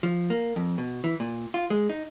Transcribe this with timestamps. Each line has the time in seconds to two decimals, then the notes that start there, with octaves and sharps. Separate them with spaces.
0.03 F3
0.30 A#3
0.56 F2
0.78 B2
1.04 E3
1.20 A#2
1.54 F4
1.70 G#3
1.90 D#4